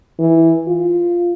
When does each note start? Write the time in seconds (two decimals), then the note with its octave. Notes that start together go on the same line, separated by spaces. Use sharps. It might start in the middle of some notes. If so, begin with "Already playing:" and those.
0.19 E3
0.67 F4